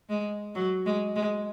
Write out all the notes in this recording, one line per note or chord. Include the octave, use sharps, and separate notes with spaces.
G#3
F#3
G#3
G#3